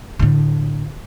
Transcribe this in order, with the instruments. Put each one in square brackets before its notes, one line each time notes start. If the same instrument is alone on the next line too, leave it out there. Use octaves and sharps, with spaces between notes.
[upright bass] A2 D3